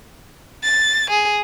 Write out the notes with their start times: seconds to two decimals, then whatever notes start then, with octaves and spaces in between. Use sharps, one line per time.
0.64 A6
1.11 G#4